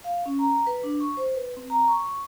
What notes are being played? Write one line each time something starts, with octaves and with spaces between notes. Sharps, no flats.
F5
C#4
A#5
B4
D4
C#6
C5
B4
C4
A#5
C#6